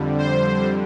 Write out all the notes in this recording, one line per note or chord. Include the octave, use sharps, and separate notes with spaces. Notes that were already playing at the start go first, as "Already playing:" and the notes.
Already playing: F2 D3 G3
C5